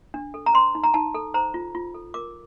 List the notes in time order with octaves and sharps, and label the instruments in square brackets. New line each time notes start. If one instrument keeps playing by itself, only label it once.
[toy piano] D4
A4
A#5
C5 C6
D#4
A#5
D#4 A5
A4
C5 A#5
F4
F4
A4
A#4 D6